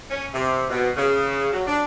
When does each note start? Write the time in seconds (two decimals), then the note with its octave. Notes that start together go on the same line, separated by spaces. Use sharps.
0.11 C#4
0.34 C3
0.70 B2
0.97 C#3
1.53 F#3
1.66 D4